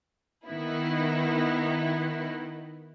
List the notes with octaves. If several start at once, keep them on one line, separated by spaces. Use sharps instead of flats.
D#3 B3 E4